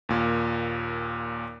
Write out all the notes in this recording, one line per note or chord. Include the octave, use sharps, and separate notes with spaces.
D#2 A#2